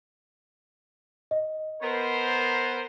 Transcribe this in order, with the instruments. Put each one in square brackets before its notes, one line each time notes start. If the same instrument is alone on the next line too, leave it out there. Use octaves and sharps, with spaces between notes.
[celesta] D#5
[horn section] B3 A#4 C5